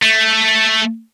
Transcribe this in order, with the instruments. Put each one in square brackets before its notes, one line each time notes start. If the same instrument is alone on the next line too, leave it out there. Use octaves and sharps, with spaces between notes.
[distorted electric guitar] A3